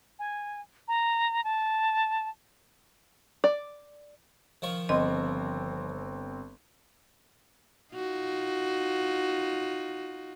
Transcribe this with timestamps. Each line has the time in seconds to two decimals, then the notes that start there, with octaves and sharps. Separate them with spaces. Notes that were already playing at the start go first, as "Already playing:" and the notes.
0.19 G#5
0.88 A#5
1.44 A5
3.44 D5
4.62 D#3 F3 C#6
4.89 G1 C4 D#5 C6
7.94 D#4 F4 F#4